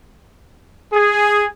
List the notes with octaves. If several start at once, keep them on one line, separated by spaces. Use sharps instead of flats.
G#4